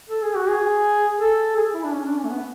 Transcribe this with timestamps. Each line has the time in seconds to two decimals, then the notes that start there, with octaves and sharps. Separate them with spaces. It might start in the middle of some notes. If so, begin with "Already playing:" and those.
0.10 A4
0.23 G#4
0.36 F#4
0.49 G#4
1.19 A4
1.57 G#4
1.74 E4
1.84 D4
1.93 C#4
2.05 D4
2.17 C#4
2.24 A3
2.29 B3